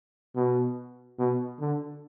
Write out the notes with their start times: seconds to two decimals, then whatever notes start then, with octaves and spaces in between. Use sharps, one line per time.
0.35 B2
1.19 B2
1.59 D3